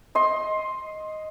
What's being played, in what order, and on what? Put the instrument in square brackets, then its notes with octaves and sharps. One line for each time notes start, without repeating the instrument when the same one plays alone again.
[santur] D#5 C6